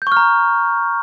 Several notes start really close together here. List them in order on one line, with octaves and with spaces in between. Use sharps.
G6 C#6 F6 A#5